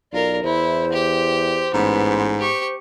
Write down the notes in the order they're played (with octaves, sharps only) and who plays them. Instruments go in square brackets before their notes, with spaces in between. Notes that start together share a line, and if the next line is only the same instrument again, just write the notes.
[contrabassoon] B1 [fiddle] F4 A#4 [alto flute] D5
[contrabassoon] E2 [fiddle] E4 [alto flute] C5
[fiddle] G4
[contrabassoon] A1 [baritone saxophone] G#2 [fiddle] B3
[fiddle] G4 C#6